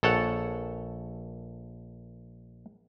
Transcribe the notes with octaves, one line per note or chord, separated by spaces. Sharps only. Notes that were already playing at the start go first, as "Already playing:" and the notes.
A#1 A4 C#5 F#5